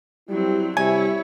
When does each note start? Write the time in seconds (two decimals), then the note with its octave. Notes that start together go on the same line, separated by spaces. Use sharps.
0.29 F#3 G3 C4 E4
0.77 C3 G3 E4 C#5 G#5